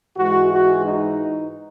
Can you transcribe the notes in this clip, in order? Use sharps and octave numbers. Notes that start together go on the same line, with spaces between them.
G#2 E3 G#3 F#4
F#4
D#4